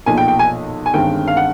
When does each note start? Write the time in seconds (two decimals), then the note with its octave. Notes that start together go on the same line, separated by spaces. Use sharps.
0.06 B1 A#2 F3 G#5
0.17 G5
0.28 G5
0.39 G#5
0.86 G#5
0.94 G1 G2 D#3 G#3 C4 G5
1.28 F5
1.37 F#5